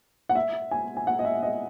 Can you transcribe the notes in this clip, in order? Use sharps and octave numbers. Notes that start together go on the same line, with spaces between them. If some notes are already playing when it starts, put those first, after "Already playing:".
F#5
E5
G#5
G#5
F#5
D#5
E5
D#5